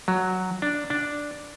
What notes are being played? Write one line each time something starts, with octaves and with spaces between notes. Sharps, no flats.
F#3
D4
D4